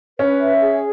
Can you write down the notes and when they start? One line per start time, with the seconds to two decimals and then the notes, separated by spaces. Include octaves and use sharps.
0.19 C#4 B4
0.40 E5
0.61 G#4